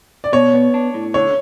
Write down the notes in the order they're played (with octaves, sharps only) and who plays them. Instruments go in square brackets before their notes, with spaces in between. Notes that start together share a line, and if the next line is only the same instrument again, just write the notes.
[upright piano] D5
[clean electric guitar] B2 [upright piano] C#5
[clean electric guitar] B3
D4
A2
[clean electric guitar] D3 [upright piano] C#5